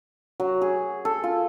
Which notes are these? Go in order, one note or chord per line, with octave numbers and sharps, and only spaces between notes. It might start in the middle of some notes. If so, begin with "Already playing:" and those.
F#3
G#4
A4
F4